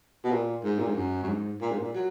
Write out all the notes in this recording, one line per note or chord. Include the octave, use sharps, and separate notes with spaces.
B2
A#2
G#2
A#2
G#2
F#2
F#2
G#2
A#2
G#2
A#2
F#3